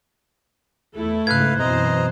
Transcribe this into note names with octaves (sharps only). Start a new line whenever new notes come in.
E2 A3 E4 A4
G#2 C#3 B4 F5 F#6 G#6
F#2 B2 E3 C4 C5 D#5 A#5